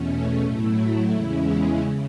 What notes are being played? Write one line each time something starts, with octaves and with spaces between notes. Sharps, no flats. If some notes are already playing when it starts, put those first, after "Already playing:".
Already playing: E2 B2 A3 C#4
A2 F#3 A3 E4
E2 C#3 G#3 C#4 E4
C#3